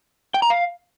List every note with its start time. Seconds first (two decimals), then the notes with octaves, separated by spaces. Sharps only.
0.34 G5
0.42 A#5
0.50 F5